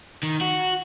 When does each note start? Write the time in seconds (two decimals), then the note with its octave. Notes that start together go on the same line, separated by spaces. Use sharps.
0.23 D#3
0.41 F#4